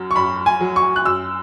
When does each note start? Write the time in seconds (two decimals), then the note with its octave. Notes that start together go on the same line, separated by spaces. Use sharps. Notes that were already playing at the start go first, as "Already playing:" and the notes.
Already playing: F#2 F#3
0.11 C#6
0.16 F#2 B5
0.46 G#5
0.61 F#3
0.76 C#6
0.96 F#6
1.05 F#2 E6